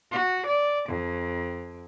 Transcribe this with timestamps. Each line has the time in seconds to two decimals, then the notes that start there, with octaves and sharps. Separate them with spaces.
0.11 F#4
0.46 D5
0.88 F2